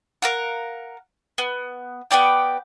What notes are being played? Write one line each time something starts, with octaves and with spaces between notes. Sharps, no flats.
A#4 F5 F#5
B3
B3 G4 D5 G5